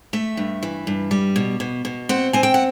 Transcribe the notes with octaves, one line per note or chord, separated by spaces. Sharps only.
A3 E5
G2
E3
G2
G3
B2
B2
B2
C4 F#5
C4 G#5
G5
F#5